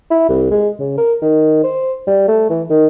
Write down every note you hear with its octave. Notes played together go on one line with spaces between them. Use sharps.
E4
C2
G#3
C#3
A#4
D#3
C5
G3
A3
E3
D#3